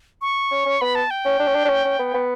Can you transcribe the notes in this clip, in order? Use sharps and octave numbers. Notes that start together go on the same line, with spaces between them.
C#6
C#4
C#4
B3 B5
A5
G5
C#4
D4
C#4
D4
D4
C#4
C#4
B3
B3